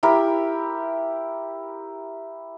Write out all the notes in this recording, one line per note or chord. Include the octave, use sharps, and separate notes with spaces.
E4 G4 A#4